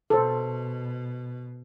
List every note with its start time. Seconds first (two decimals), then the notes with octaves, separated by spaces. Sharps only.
0.10 B2 A4 C5